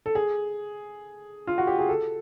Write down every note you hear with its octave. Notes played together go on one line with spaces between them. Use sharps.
A4
G#4
F4
F#4
G4
G#4
A4